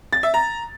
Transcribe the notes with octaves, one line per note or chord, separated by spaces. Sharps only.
A6
E5
A#5